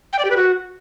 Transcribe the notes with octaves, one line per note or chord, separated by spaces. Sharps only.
G5
D5
G4
B4
F#4